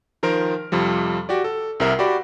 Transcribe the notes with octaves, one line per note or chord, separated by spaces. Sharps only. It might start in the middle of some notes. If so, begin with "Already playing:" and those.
D#3 F3 A#4 C5 F6 D7
F2 C3 F3 G3
F#4 G4 D5
A4
C2 C3 A#4 E5 C7
F#4 G4 D5 B5